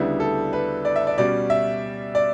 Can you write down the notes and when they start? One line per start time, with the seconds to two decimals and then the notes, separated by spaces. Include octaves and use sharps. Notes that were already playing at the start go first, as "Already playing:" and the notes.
Already playing: D2 C#3 G3 B3 D4 E4
0.20 A4
0.53 B4
0.85 D5
0.96 E5
1.07 D5
1.18 B2 G3 C#4 D5
1.50 E5
2.15 D5